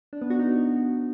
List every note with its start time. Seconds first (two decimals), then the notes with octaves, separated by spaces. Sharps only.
0.13 D4
0.22 B3
0.30 F#4
0.39 D#4